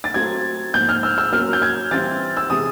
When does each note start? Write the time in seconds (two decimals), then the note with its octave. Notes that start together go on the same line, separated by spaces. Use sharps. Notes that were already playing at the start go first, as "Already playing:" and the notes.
0.04 A6
0.14 F#3 A3 C4 F4 A4 G#6
0.74 G#2 F3 A#3 D#4 G6
0.89 F6
1.03 E6
1.18 E6
1.32 F#3 A#3 C#4 F4 A#4 F6
1.53 G6
1.62 G#6
1.91 E3 G3 C4 F4 A6
2.37 E6
2.50 C3 E3 G#3 D#6